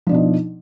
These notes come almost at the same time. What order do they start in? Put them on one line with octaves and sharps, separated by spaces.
F3 D4 B2 D#4